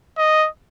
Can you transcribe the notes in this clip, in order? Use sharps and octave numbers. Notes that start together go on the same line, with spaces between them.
D#5